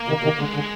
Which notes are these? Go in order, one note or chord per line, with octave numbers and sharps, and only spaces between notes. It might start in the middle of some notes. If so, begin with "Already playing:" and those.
Already playing: A#3
C3 D#3
C3 D#3
D3 G#3
D3